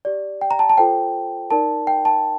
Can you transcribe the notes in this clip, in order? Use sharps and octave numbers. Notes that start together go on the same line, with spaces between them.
G4 D5
G5
A#5
A5
A5
F4 A4 C5 G5
D#4 A#4 D5 A5
G5
A5